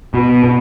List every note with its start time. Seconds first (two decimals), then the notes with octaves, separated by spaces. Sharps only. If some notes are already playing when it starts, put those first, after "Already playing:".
0.14 B2
0.44 B2